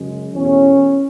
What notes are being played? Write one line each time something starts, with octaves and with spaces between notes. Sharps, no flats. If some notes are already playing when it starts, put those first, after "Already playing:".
Already playing: F#2 C#3 G#3
E2 B2 A3 C#4